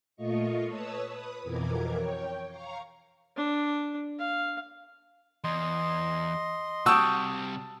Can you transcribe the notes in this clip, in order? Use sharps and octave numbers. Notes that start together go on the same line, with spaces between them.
A#2 A3 F4 D#5 C#6
B4 C#5 A5 C#6 D#6 E6
B4 B5 D#6
F2 B2 E3 A#4 D6 G#6
C#5 G5
F5 A#5 C#6
D4
F5
E2 D#5 C6
C3 G3 F#4 G5 A5 D#6 E6